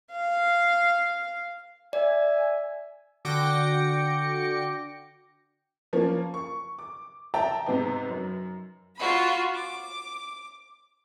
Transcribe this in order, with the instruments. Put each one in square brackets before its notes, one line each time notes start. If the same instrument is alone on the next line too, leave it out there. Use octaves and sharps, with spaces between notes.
[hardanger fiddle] F5
[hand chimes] D5 [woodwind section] E5 G#5
[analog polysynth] D3 F#4 G5 D6 A#6 C#7
[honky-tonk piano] F3 A#3 C#4
C#6
D6
E5 G5 A5 A#5
G#2 C3 B3 D#4
F#2
[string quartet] F4 F#4 B5
D6